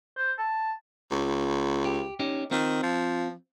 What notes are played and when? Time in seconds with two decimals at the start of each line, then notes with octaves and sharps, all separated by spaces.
0.17 C5
0.38 A5
1.11 C#2
1.85 G4
2.19 C#4 D#4 G4
2.51 D#3 C4 F4
2.83 F3